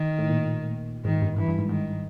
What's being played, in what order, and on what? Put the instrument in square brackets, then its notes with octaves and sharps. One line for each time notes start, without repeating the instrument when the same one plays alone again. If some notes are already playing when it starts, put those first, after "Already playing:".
Already playing: [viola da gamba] D#3
[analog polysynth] A2
A#2
[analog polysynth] G#2 [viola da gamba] D#3
[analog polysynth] G2
[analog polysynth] G2 [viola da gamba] E3
[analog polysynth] G2
G#2
[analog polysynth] G#2 [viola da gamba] D#3